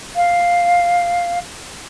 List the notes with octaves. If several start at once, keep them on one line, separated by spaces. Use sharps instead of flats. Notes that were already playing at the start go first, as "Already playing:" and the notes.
F5